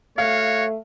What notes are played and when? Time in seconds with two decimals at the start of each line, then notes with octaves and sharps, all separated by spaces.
0.18 A3 F#4 C#5 F5